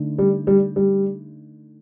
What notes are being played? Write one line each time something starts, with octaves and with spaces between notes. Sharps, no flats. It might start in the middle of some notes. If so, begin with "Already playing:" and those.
Already playing: D3 A3 D#4
G3
G3
G3